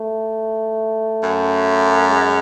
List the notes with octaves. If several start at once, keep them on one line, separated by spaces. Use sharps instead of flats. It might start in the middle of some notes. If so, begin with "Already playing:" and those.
Already playing: A3
F#2
G#3